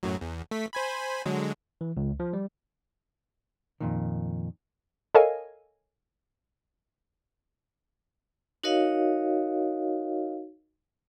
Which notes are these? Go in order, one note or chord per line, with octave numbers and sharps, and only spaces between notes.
F#2 A2 F#3
E2
A3 B6
C5 G#5 B5
D3 F#3 G#3
E3
C#2
F3
G3
F2 A#2 D#3
A4 A#4 C#5 D#5 F5 G#5
D#4 F#4 A#4 C#5 D#5 F5